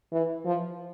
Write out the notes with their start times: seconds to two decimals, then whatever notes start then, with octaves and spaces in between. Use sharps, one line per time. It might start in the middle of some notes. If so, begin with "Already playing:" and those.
0.12 E3
0.46 F3